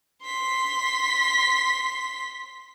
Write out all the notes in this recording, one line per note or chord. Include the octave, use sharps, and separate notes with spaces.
C6 B6